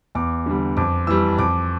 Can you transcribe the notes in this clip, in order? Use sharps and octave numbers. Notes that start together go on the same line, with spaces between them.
E2 D6
D3 G3
F2 D6
E3 G3 E6
F2 D6